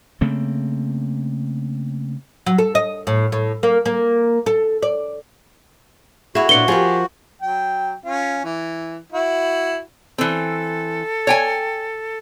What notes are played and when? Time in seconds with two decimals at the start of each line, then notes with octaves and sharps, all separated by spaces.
0.21 C#3 A3 A#3 C4
2.46 F#3
2.58 A4
2.75 D#5
3.07 A2
3.32 A2
3.63 A#3
3.86 A#3
4.46 A4
4.83 D5
6.35 E4 F#4 G#4 C#5
6.49 A#2 D4 B4 C#7 G7
6.68 F3 F4 G4 G#4 A#4
7.42 F#3 G5
8.05 C#4 F4
8.45 E3
9.12 E4 F#4
10.18 E3 C4 A4
11.27 C#5 G5 G#5